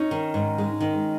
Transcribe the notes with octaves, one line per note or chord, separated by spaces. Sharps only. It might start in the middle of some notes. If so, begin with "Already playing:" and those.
Already playing: C#4 D#4
D#3
G#2
G#3
D#3